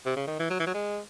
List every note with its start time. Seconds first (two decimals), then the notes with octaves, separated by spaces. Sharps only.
0.06 C3
0.16 C#3
0.27 D#3
0.39 E3
0.50 F#3
0.60 E3
0.67 F#3
0.74 G#3